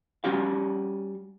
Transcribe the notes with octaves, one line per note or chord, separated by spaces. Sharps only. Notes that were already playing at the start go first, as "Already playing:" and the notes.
G3 C#4 F#4 G4 F5